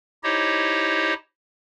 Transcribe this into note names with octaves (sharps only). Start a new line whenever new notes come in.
D#4 E4 G4 C5 C#5 D#5